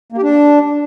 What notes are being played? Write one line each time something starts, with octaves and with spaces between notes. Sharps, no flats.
A#3
G4
D4